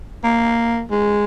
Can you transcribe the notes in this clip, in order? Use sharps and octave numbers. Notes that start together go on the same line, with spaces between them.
A#3
G#3